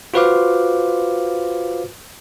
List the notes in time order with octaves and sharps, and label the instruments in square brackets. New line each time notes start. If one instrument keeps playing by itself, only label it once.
[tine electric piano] F4 F#4 B4 C5 F5 D6